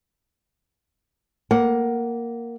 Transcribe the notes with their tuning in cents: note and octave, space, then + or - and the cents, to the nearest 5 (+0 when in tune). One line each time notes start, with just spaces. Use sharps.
A#3 +0 F#5 +10